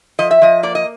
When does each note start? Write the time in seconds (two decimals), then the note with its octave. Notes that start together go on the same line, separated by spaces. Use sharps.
0.19 F3 D#5
0.31 E5
0.42 F3 D#5
0.63 A#3 D5
0.75 D#5